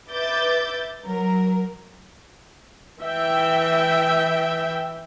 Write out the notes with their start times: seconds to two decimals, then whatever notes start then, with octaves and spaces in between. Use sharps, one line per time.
0.11 B4 E5 D6 G6 A6
1.04 F#3 A#4
3.00 E3 E5 G5